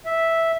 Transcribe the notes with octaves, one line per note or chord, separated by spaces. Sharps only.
E5